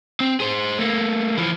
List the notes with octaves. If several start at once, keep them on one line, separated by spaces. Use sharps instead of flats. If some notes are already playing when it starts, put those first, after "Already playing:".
C4
G#4 C5
A3 A#3
E3 F3